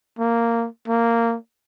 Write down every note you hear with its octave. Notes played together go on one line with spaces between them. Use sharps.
A#3
A#3